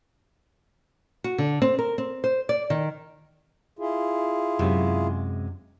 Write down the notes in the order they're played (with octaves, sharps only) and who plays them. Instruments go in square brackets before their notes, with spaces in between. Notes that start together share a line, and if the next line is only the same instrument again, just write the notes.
[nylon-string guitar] F#4
D3
C4
A#4
C4
C5
D5
D#3
[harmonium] E4 F4 G#4
[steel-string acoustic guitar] F#2 C3 G#3